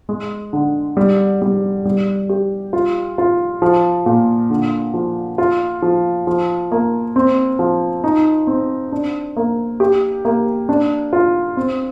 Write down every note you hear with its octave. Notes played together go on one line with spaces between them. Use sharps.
G#3
D3
G3
G3
G3
G4
F4
F4
F3
A#2
D3
F3
F4
F3
F3
A#3
C4
F3
D#4
C4
D4
A#3
G4
A#3
D4
F4
C4